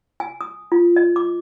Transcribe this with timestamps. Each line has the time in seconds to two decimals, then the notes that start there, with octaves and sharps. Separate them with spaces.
0.20 G#5
0.41 D#6
0.72 F4
0.96 D#5
1.16 D6